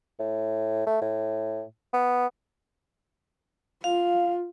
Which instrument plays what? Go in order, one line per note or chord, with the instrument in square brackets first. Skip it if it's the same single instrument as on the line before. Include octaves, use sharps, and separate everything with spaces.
[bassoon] A2
A3
A2
B3
[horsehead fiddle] F4 [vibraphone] F5